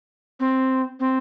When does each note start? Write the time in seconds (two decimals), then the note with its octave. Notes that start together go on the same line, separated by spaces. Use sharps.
0.40 C4
1.00 C4